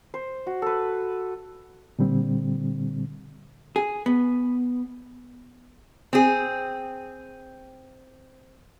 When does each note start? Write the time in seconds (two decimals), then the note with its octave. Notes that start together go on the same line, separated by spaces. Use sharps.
0.14 C5
0.46 F#4
0.62 A4 B4
1.99 A#2 D3 G3 C4
3.76 G#4
4.06 B3
6.13 C4 G#4